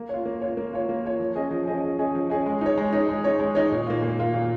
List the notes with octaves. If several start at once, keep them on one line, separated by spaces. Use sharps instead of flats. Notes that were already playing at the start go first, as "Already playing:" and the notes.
Already playing: A#3
F4 C#5
A#3
F4 C#5
A#3
F4 C#5
A#3
F4 C#5
F3
C#4 G#4 D#5
F3
C#4 G#4 D#5
F3
C#4 G#4 D#5
F3
C#4 G#4 D#5
G#3
D#4 C#5
G#3
D#4 C#5
G#3
D#4 C#5
G#3
D#4 C#5
A#2
A#3 F4
A#2
A#3 F4
A#2